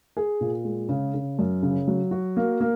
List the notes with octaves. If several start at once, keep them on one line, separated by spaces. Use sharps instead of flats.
G#4
A#2
G#3
C#3
C#3
F#2
C#3
F#3
F#4
A#3
A#3